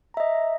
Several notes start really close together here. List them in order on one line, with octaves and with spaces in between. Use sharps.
A#5 E5 D#5